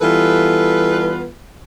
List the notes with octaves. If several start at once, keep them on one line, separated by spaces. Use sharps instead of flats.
E3 G3 B3 F4 A4 B4